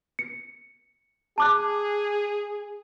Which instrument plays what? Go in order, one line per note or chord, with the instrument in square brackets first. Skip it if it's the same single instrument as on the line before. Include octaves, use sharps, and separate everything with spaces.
[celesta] C#7
[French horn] G#4 [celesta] A5 D6 F#6